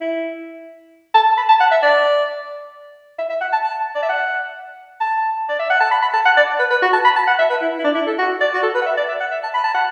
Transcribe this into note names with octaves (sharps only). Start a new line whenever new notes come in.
E4
A5
B5
A5
F#5
E5
D5
E5
E5
F#5
A5
A5
D5
E5
F#5
A5
D5
E5
F#5
A5
B5
B5
A5
F#5
D5
B4
B4
F#4
A5
B5
A5
F#5
E5
B4
E4
E4
D4
E4
A4
F#4
D5
F#4
A4
B4
F#5
E5
D5
E5
F#5
E5
A5
B5
A5
F#5